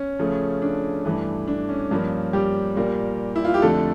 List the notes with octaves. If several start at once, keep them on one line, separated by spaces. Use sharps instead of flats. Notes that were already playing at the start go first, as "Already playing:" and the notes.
Already playing: C#4
C#3 F3 A3
D4
G2 E3 A3
D4
C#4
G2 F3 A#3
G3 G4
A#2 G3 A#3
E4
F4
G4
F2 D3 A3 A4